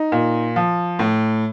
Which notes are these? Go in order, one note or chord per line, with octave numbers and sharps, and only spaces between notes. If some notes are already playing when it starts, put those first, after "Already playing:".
Already playing: D#4
A#2
F3
A2